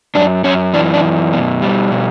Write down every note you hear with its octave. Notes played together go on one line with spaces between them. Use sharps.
F#2 D4
F#2 C#4
E3 D4
D4
F#2
B2
G3
B2